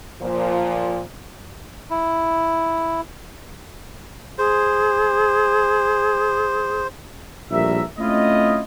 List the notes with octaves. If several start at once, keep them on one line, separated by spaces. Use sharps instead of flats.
A#2 F3
E4
G#4 C5
A#1 A2 G3 A#4 E5
A3 C4 C#4 E4 F4 D#5